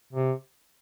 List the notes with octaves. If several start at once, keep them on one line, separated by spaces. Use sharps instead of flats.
C3